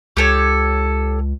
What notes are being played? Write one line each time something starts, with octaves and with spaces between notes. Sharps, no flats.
C#2 G4 A4 C#5